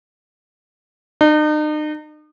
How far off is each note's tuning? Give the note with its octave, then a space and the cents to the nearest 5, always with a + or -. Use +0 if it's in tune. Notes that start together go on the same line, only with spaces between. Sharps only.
D#4 -40